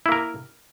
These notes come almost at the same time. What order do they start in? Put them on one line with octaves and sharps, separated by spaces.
E4 A#3 A#4